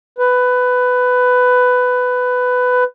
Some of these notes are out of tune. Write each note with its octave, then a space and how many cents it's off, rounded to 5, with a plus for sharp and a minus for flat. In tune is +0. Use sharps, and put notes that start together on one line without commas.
B4 +15